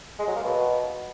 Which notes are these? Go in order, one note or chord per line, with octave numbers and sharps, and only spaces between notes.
G#3
F#3
A#3
B2